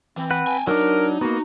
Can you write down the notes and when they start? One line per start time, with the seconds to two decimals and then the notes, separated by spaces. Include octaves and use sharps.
0.17 E3 C4
0.31 B4 F#5
0.47 G5 G#5
0.67 F#3 D4 D#4 A#4
1.21 A#3 B3 F#4